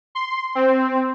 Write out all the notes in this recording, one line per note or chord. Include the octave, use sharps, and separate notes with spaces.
C6
C4